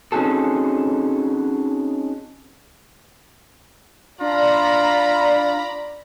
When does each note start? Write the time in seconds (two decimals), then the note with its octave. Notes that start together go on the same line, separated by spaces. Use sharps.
0.12 C4 C#4 D#4 F#4 G#4 A4
4.21 D4 F4 D5 A#5 B5